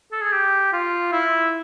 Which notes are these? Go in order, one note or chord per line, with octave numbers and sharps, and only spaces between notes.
A4
G#4
G4
F4
E4